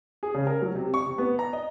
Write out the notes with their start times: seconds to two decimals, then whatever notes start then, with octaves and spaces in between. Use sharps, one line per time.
0.23 G#4
0.34 C#3
0.47 A#4
0.62 F#3
0.75 C3
0.94 C#6
1.06 C3
1.18 B3
1.39 A#5
1.53 D#5